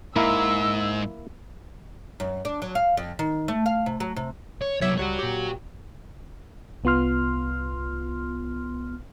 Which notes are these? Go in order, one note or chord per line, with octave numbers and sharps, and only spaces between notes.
G#2 A#3 E4 A#4 E6
F#2
D4
F#3
F5
F2
D#3
A3
F5
C3
F#3
C3
C#5
C2 F#3 C#5 E5 D6
C#2 F#3 G3 F#4 C#5
A#2 G4
C2 B3 F4 C6 F6